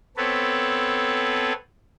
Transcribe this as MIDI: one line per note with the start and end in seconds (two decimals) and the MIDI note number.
0.17 1.53 59
0.17 1.53 60
0.17 1.53 69
0.17 1.53 71
0.17 1.53 73